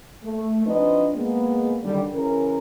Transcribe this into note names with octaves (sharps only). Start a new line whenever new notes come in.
A3
F3 C4 D4 D#4 B4 D#5
G#3 A#3 B3
F#2 D3 D#3 G3
C#3 E3 C#4 A#4